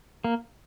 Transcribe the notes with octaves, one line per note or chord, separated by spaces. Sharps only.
A#3